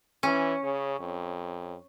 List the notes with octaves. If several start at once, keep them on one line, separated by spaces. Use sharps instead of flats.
E3 C#4
C#3
F2